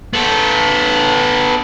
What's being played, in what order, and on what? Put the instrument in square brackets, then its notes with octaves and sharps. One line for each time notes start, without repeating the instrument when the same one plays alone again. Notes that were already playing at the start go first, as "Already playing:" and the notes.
[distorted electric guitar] B3 A4